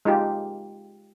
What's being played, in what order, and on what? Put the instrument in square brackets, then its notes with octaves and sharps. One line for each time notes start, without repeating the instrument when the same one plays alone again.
[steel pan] G#3 D#4 F4 G4